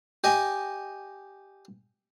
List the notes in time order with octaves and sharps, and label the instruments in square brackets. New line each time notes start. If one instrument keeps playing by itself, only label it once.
[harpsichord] G4 D#5 G#5